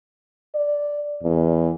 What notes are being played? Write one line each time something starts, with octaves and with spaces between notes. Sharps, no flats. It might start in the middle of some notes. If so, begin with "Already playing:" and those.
D5
E2